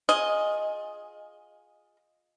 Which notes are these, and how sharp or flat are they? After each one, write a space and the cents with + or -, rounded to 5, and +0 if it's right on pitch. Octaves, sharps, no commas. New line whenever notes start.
F4 +20 G#4 +0 D#5 +0